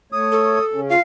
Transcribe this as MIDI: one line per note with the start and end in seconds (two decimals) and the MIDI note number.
0.12 0.59 57
0.12 0.59 73
0.12 0.65 87
0.32 0.81 69
0.73 0.94 49
0.73 0.94 61
0.90 0.98 65
0.90 1.01 77